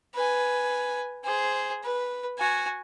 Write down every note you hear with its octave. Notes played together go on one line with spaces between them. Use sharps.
B4 G#5
G#4 C5
B4
F#4 G#5